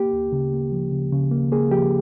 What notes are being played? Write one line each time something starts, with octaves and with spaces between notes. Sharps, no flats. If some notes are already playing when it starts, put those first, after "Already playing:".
Already playing: A#3 G4
D2
C#3
A#3
F3
C#3
C#3
A#3
A#3 G#4
F3 G4